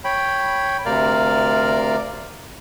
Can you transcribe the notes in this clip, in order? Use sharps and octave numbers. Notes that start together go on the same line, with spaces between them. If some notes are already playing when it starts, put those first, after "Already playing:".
C#5 G5 B5
D2 C3 A#4 D5 F5